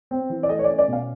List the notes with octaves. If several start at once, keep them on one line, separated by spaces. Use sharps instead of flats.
C4
E3
D5
A3 D#5
C#5
D5
C#4
D5
B2 F5